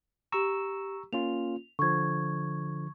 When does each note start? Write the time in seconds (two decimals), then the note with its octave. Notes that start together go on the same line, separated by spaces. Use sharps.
0.32 G4 A#5 C#6 E6 E7
1.13 A#3 C#4 F4 F7
1.79 D3 F3 C#6 G#6